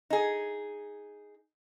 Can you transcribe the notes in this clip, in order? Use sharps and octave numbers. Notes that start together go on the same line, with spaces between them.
D#4 G#4